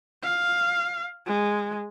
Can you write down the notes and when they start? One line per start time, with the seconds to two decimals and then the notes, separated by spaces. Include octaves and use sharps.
0.23 F5
1.27 G#3